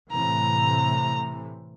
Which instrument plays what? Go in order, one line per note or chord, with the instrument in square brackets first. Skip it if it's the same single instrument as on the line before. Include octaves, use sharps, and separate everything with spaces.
[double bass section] A2 C3 E3 [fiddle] A#5